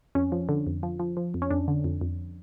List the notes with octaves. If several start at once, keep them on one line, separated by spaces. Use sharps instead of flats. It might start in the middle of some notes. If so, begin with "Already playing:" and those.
F2 C#4
F3
D3
F2
F3
F3
F3
F2
C#4
F2 D4
D3
F2
F2